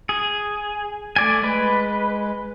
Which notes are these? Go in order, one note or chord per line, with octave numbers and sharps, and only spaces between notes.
G#4
A3 D5 G#5
G#3 B4